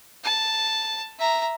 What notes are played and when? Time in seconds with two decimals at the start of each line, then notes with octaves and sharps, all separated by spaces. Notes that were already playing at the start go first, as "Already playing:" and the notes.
0.24 A5
1.19 E5 A#5